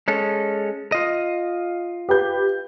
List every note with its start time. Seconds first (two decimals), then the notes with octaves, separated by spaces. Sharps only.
0.08 G#3 C#4 A4
0.92 F4 D#5
2.09 G4 B4 G6